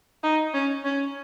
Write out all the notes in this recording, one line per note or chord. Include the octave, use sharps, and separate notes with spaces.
D#4
C#4
C#4